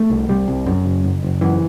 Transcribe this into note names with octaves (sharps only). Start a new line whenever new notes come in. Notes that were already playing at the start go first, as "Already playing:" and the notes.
Already playing: A3
C2
C2 G3
C2
F#2
F#1
F#1
F#1
F#2 E3